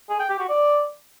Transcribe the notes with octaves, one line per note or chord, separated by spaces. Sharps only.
G#4
G5
G4
F#4
D5